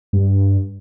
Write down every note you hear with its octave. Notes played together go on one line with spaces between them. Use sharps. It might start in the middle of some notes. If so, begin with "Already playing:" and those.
G2